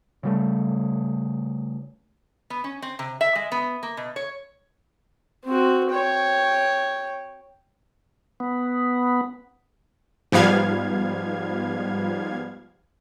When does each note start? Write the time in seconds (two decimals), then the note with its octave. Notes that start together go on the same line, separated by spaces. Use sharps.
0.23 C#3 G3 A3
2.50 B3
2.64 C#4
2.82 C4
2.99 C3
3.21 E5
3.35 G#3
3.52 B3
3.83 A#3
3.97 B2
4.16 C#5
5.45 C4 F#4
5.92 C#5 G5
8.40 B3
10.32 G#2 F3 G3 B3 F5 G#6